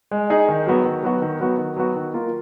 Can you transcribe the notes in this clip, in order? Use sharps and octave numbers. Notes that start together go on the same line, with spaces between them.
G#3
D#4 G#4
D#3
F#3 B3 F#4
D#3
F#3 B3 F#4
D#3
F#3 B3 F#4
D#3
F#3 B3 F#4
D#3
A#3 F4 A#4